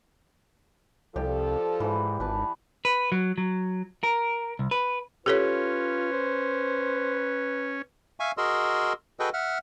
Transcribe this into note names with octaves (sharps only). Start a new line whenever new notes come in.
C2 F3 G4 A4 D5
G#2 E3
G#1 B4 A5
B4
F#3
F#3
A#4
C2
B4
C#4 F4 G4 A4 B4 C#5
C5
E5 F5 G#5 C#6
F#4 G#4 A#4 D#5 C6 E6
F#4 G#4 A4 B4 D#5 G5
E5 F#5 F6